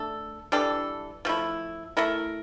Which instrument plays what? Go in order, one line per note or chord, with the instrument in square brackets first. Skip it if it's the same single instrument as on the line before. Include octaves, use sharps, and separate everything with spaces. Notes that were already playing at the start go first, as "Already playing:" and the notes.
Already playing: [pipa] A3 D4 A4
E3 G3 D4 A4
F3 A3 E4
A3 E4 A#4